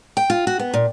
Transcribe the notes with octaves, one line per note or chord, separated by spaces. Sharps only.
G5
F4
F#4
B3
A#2